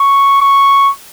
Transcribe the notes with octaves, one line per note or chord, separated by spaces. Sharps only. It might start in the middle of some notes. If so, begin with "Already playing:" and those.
Already playing: C#6
C#6